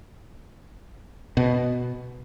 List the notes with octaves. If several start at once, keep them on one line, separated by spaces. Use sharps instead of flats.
B2